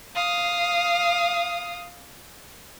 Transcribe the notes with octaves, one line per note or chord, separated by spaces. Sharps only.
F5 D#6